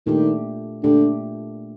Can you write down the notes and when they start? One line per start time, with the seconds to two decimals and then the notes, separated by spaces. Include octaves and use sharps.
0.06 A#2 D#3 A3 D4 G4
0.83 A#2 D3 A3 D4 G4